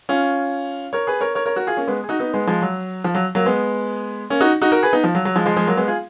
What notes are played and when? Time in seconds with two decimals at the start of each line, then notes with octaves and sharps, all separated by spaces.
0.09 C#4 F4
0.93 A#4 C#5
1.07 G#4 B4
1.21 A#4 C#5
1.35 A#4 C#5
1.46 A#4 C#5
1.56 F#4 A#4
1.67 F4 G#4
1.77 A#3 C#4
1.88 G#3 B3
2.04 G#4
2.09 D#4 F#4
2.20 B3 D#4
2.33 G#3 B3
2.47 F3 G#3
2.62 F#3
3.04 F3
3.15 F#3
3.35 F#3 A#3
3.46 G#3 B3
4.30 A#3 C#4
4.41 D#4 F#4
4.61 D#4 F#4
4.72 F#4 A#4
4.83 G#4 B4
4.93 B3 D#4
5.04 F3
5.15 F#3
5.25 F#3
5.36 F3 G#3
5.46 F3 G#3
5.56 F3 G#3
5.66 F#3 A#3
5.77 G#3 B3
5.88 F4 G#4